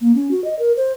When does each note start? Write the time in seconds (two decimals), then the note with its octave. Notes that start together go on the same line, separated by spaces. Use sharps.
0.01 A#3
0.15 C#4
0.31 F#4
0.44 D#5
0.59 A#4
0.77 C5